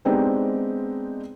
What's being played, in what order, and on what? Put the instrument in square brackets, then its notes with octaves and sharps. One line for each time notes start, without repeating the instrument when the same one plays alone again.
[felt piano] G#3 B3 C4 D4 D#4 G4